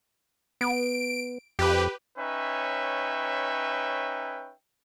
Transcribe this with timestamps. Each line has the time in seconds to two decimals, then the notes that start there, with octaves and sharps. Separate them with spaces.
0.61 B3 D7
1.59 F2 G4 B4
2.18 C#4 D#4 B4 C#5 E5 G5